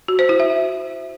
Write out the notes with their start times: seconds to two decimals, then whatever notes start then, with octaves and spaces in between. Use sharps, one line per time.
0.08 F#4
0.19 C5
0.29 E4
0.40 E5